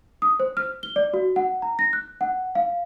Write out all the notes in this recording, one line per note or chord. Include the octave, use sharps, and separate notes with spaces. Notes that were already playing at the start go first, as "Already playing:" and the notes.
D#6
C5
F6
G7
D5
F#4
F#5
A#5
A#6
F#6
F#5
F5